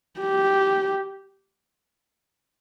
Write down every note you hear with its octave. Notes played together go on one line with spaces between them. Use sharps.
G4